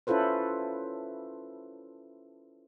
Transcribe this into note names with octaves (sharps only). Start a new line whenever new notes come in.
C#4 E4 F4 A4 B4 C5